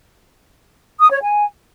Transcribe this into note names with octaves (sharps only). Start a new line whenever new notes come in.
D#6
C#5
G#5